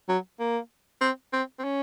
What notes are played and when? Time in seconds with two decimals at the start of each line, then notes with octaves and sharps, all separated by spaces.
0.09 F#3
0.39 A#3
1.01 C4
1.33 C4
1.59 C4
1.64 C#4